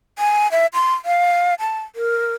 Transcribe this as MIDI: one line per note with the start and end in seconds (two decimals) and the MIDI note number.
0.19 0.50 80
0.52 0.66 76
0.74 0.94 84
1.05 1.54 77
1.59 1.82 81
1.95 2.33 70